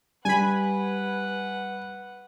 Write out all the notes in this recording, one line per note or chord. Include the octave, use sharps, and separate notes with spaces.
G3 B4 F#5 G#5 B5